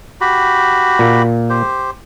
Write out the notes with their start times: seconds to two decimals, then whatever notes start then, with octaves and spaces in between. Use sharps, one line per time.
0.21 F#4 G4 B5
0.99 A#2 A#3
1.50 G4 C5